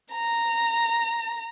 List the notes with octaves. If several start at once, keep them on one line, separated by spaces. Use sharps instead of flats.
A#5